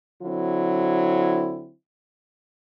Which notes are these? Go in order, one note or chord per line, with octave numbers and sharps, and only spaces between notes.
D3 F#3 C4 E4